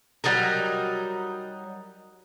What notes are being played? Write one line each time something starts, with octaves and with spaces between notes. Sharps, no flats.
F#3 G3 D#4 A#4